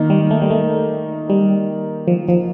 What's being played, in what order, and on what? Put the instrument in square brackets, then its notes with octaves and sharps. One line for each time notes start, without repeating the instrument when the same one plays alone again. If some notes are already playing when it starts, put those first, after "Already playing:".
Already playing: [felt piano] D#3 A#3 D#4
[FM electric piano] G3
A3
G3
A3
G3
F3
F3